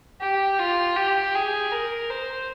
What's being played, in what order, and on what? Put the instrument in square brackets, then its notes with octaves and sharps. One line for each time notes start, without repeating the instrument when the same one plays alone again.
[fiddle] G4
F4
G4
G#4
A#4
C5